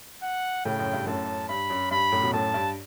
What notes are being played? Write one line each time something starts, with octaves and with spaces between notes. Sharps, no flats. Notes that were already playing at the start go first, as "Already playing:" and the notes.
F#5
A2 C#3 G5
F#2
G2
F#2 A2 A5
G2 B5
F#2
G2 B5
F#2 A2
B2
F#2 A2 A5
G2